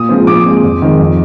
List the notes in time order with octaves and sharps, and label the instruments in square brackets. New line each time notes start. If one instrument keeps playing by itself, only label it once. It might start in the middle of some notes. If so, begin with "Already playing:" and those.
Already playing: [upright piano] A#2 D#6
F3 G#3 C4
A#2 D6
G#3 C4
F2
D#3 G#3 C4
F2